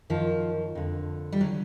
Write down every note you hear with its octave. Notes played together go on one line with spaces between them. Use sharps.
F#2 D#3 F3
F2 D3
G3
D3 F#3